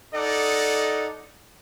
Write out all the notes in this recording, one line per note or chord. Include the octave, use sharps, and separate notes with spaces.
D#4 A4 D5 D#5 F#5